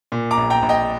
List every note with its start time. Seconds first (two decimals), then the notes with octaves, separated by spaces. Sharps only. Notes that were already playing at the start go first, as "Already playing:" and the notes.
0.12 A#2
0.31 A#5 D6
0.37 A#1
0.50 G5 A#5
0.62 A#1
0.69 D#5 G5